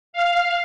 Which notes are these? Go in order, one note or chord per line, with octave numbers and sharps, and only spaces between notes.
F5